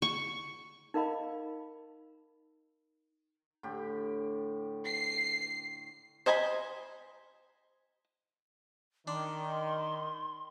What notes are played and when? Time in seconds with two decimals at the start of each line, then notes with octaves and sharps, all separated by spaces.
0.02 C#6
0.94 D#4 A#4 D#5 F5 B5
3.63 A2 D3 G4
4.85 C7
6.26 C5 D#5 G#5 A#5 B5
9.07 D#3 D4 C6